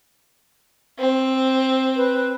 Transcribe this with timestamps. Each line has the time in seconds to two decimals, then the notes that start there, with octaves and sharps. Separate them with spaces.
0.99 C4
1.96 B4